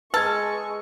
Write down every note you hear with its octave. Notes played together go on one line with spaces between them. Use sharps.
G#3 B4 A5 C#6 E6 G#6